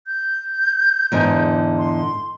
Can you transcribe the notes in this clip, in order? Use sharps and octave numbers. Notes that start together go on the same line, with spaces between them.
G6
E2 G#2 D3
C6